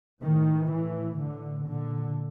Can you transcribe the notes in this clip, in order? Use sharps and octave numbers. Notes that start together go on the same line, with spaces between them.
A2 D#3
A2 E3
A2 D3
A#2 D3